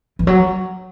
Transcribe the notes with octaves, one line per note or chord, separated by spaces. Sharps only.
E3
F#3